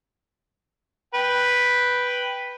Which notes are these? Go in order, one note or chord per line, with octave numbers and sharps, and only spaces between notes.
B4 G5